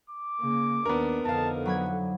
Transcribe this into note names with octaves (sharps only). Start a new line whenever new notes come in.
D6
C#3 A#3
D#2 B3 D4 A#4
F2 D3 D#4 F5 A5
F#3 F#5 B5 G#6